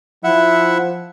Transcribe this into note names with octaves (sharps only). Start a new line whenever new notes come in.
F3 E4 E5 F#5